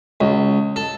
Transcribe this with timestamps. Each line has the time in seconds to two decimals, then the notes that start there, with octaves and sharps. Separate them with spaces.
0.21 C#2
0.76 A4